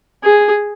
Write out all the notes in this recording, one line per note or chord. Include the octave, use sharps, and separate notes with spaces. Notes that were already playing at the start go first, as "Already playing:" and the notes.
G#4